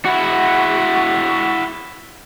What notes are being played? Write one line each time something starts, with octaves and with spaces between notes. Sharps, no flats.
E4 F#4